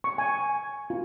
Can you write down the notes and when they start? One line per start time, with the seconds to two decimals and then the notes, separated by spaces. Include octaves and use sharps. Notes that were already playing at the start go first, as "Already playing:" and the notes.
0.04 C#6
0.18 G#5
0.90 F4